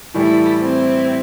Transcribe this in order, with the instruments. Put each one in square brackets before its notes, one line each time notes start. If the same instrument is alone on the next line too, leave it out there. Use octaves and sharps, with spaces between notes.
[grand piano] A2 E3 G3 [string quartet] E4 A4
[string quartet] C4 E4